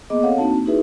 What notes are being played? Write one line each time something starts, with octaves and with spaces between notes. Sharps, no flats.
A#3 B3 G#4 D#5 D6
C4 A4 C#5 F5 F#5
A#3 C4 D4 D#4 F#4 A5
A#3
D#4 E4 F#4 G#4 B4 E5